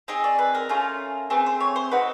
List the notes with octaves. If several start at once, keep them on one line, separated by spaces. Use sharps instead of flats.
C4 D#4 G#4 D#5
D5
B4
A#4
A3 C#4 F4
A3 C4 G#4 B4
C5
C#5
C5
C4 D#4 F#4 B4